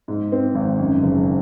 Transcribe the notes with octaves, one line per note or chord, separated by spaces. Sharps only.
G#2
C4
G#1
F#2
F#1